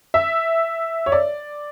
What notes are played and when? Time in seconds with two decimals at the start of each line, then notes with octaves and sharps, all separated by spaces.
0.14 E5
1.06 C#5
1.12 D5